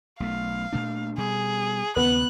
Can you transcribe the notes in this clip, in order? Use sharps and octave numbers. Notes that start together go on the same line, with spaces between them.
B1 A3 F5
A#2 A3 D4
B2 G3 G#4
D#2 C#3 B3 F#6